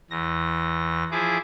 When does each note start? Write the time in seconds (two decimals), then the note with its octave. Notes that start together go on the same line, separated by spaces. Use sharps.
0.10 E2 A#6
1.11 F3 E4 G#4 D6